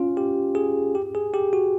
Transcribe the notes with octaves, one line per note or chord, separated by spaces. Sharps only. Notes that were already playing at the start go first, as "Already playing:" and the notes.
Already playing: C#4 F4
G4
G#4
G4
G#4
G4
F#4